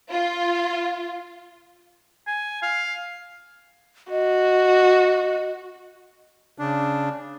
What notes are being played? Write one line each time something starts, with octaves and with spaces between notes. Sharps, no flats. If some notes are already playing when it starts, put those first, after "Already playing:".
F4
G#5
F5
F#4 D#5
C#3 D4